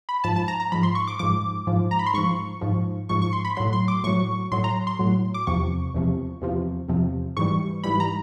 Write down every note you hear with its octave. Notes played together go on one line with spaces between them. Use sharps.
B5
G#2 F3 A5
A5
A#5
A#5
G#2 F3 B5
C6
C#6
D6
G#2 F3 D6
G#2 F3
A#5
B5
C6
G#2 F3 C#6
G#2 F3
G#2 F3 C#6
C#6
C6
B5
A2 F#3 C6
C6
D6
A2 F#3 C#6
A2 F#3 C6
A#5
C6
A2 F#3
D6
E2 C3 F3 C#6
E2 C3 F3
E2 C3 F3
E2 C3 F3
G#2 E3 G3 C#6
G#2 E3 G3 B5
A#5